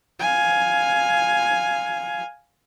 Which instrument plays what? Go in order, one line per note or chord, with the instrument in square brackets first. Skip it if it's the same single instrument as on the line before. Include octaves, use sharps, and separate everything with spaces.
[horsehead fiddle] F5 G#5